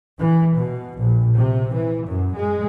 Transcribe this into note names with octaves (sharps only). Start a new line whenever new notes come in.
E3
B2
A#1
C3
E3
F#2
G#3